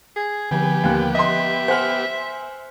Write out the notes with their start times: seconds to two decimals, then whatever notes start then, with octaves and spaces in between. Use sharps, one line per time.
0.16 G#4
0.51 D3 F3 B3 G4 G#5
0.84 D#2 A#3 F#6
1.15 D#5 E5 C6
1.68 C5 F#5 G#5 C6 F6